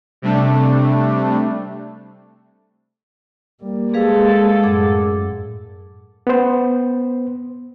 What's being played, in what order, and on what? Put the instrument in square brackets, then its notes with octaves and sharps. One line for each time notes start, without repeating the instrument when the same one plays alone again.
[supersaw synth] C3 G3 A3 D4
[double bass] G3 A#3
[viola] G#3 A4 [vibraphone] G#4 B4 F5
[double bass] F#2 A2 [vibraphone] G#4 F#5 D6
[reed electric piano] B3 C5